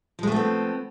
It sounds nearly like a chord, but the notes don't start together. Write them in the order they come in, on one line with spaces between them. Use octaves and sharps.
F3 G#3 A3 B3 C4